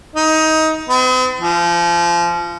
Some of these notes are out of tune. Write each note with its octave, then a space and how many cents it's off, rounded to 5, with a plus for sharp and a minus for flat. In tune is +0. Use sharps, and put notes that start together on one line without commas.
D#4 +20
C4 -45
F3 -25